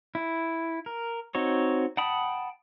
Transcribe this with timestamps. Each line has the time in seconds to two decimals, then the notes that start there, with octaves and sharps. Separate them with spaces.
0.15 E4
0.86 A#4
1.35 C4 D#4 F#4 C#5
1.97 F#5 G5 A5 B5 D#6